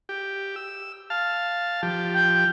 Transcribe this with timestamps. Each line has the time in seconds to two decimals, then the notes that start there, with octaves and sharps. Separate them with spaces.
0.09 G4
0.56 E6
1.10 F5 A5
1.83 F3 G4
2.14 G5